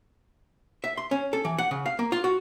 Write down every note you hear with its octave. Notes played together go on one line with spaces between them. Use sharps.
E5
C6
C#4
A4
E3
F#5
C#3
F5
A#3
F4
F#4